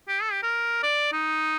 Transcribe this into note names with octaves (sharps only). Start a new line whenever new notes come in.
G4
A4
G4
A#4
D5
D#4